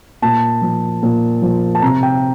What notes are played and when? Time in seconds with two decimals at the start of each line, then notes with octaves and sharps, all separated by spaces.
0.22 A#2 A5
0.62 F3
1.03 A#2
1.42 F3
1.75 A5
1.82 C3 A#5
2.03 G5